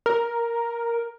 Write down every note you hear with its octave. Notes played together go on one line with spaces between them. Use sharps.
A#4